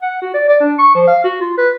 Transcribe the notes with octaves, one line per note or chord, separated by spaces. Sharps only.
F#5
F#4
D5
D5
D4
C#6
F3
F5
F#4
F4
B4